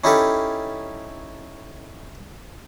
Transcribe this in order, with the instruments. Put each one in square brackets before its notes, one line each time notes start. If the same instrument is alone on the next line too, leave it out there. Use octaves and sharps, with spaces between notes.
[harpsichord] C#4 D#4 E4 G4 A4 F5